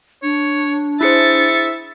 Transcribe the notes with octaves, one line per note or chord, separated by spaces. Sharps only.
D4 C#5
E4 G#4 C5 E5 A6 C#7